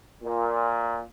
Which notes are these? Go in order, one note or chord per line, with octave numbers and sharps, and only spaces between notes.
A#2